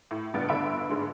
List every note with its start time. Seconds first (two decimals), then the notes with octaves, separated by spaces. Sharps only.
0.11 A2
0.34 C#2 G2 B3 D5 A6 D7
0.49 G1 D3 E5 B5 D7
0.89 G#2 D3 G#3